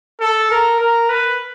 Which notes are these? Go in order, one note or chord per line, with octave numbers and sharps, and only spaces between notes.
A4
A#4
A#4
B4